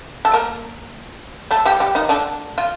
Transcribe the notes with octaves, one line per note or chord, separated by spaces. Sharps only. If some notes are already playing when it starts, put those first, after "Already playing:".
A4
A#3 A#4
A3 A4
G3 G4
G3 G4
D#3 D#4
D3 D4
F4